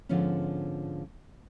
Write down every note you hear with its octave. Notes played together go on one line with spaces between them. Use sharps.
G#2 D3 F3 B3 C#4